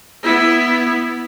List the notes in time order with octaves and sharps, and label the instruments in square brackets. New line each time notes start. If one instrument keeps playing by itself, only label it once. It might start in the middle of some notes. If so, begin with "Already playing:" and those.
[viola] B3 E4